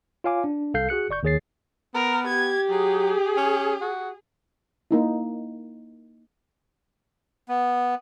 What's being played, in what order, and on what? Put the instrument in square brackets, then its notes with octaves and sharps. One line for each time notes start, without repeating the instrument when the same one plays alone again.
[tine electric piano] F4 C#5 F5 G#5 D6
D4
C2 A4 F5 G6 C7
F#4 G#4 F#6 C#7
G1 D5 C#6 G6
D#2 D#3 G#4 C#5 A6 C7
[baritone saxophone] B3 [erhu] A#4
[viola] G4 [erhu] G#6
[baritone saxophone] F#3 [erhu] G#4
[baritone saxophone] C#4
F#4
[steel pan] A#3 D#4 E4
[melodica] B3